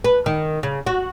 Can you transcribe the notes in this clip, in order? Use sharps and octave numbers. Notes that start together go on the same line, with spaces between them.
B4
D#3
C#3
F#4